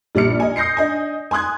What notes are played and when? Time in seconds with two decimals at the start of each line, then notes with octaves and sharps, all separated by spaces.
0.15 A#1 G3 D5 F6 C#7
0.40 D#5 G#5
0.56 D#6 G6 A#6 C7 C#7
0.77 D4 D#5 G#5
1.31 G#5 C6 D#6 F#6 G#6